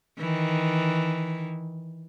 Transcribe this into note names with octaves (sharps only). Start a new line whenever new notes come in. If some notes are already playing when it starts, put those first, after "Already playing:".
D#3 E3